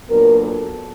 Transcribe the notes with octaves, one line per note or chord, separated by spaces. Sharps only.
A#2 F#3 B3 D4 A#4
A4